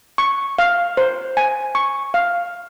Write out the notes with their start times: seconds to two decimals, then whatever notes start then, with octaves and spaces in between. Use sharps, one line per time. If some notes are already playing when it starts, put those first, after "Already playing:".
0.18 C#6
0.59 F5
0.97 C5
1.37 G#5
1.75 C#6
2.14 F5